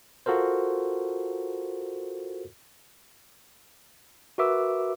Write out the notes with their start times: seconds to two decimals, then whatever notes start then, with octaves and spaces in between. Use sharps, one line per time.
0.26 F4 F#4 A4 A#4 C5
4.38 F#4 A#4 B4 E5 D6 E6